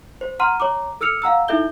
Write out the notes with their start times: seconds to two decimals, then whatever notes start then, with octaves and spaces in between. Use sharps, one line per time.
0.21 C5
0.40 F#5 A#5 C6 F6 D#7
0.60 C#5 A#5 D6
1.01 A4 E6 F6 C#7 F7
1.22 F5 F#5 A#5 E6
1.48 D#4 E4 A4 E5 G6 G7